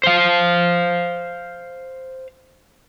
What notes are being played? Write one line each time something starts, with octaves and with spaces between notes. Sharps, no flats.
C5 F5